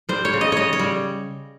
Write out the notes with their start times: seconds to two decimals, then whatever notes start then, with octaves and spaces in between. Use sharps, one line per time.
0.09 G3 C5
0.25 C#5
0.33 C#3
0.41 D#5
0.52 C#3 C#5 D#5
0.73 C#5
0.79 G3